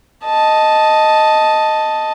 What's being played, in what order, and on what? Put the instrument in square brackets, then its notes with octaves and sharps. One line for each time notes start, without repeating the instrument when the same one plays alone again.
[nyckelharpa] D#5 A5